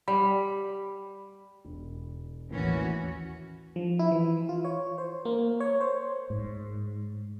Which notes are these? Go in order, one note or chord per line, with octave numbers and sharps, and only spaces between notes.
G3 B5
E1
A1 D#2 E3 C#4 F#4
F3
E4
E3
F4
C#5
C5
A#3
C#5
C5
G#2